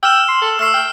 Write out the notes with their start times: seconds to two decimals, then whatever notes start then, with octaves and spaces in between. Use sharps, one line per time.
0.03 G5 E6 F6 E7
0.28 C6
0.42 A4
0.59 A3 E6 F6 C7
0.74 G5 F6